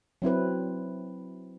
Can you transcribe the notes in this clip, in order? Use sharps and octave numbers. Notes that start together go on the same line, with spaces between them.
F#3 C4 E4 B4